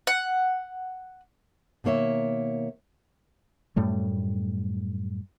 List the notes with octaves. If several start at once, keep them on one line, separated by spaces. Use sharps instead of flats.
F#5
B2 D#3 A#3 C#5 E5
F#2 A2 G3 A3